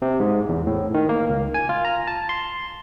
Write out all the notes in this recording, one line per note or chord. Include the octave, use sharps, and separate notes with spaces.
C3
G#2
E2
A2
D#3
A#3
C#2
G#5
F4
A#5
A5
C6